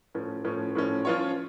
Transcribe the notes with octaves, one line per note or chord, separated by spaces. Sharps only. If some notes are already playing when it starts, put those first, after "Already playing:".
A2 F3 C#4
A2 F3 C#4
A2 F3 C#4
F3 C#4 F4 C#5